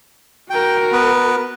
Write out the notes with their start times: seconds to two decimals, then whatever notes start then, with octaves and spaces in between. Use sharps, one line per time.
0.50 F#4 A#4 G5
0.92 B3 B4